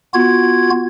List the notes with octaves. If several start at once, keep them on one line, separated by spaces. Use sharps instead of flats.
B3 F4 F#4 G#6